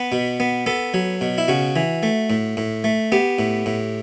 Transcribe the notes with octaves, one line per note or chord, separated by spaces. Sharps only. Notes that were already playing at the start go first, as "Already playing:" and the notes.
Already playing: B3 B4
B2
B3
B3 A4
F#3
B2
E4
C#3 F#4
E3
A3
A2
A2
A3
B3 G4
A2
A2